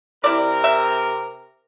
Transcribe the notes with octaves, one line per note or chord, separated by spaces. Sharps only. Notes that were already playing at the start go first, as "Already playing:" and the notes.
C3 E4 A#4 D5
E5